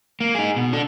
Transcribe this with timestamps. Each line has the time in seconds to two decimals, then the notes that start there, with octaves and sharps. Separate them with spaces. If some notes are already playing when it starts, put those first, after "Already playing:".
0.21 A#3
0.35 D#4 G#4
0.56 B2
0.73 D4 A4